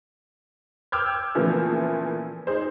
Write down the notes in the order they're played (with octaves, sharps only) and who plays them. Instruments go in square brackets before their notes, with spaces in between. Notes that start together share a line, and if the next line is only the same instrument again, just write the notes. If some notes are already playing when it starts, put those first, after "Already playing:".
[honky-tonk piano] G5 D6 E6 F6 G6 G#6
A#2 C#3 E3 F3 A3 B3
D#4 G#4 C5